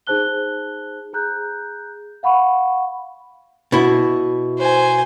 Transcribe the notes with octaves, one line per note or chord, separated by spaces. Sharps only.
D#4 G#4 C5 A5 F#6 G7
G#4 A#5 F#6 G6
F5 F#5 B5 C#6
B2 E4
C5 G#5